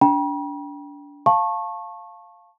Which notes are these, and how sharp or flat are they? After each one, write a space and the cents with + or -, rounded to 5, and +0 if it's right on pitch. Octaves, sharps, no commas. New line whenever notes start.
D4 -30 G5 +0 B5 -45
F5 +0 A5 +0 C#6 -25